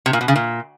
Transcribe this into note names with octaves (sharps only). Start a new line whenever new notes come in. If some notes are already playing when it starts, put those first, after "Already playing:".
C3
A#2
B2
C#3
A#2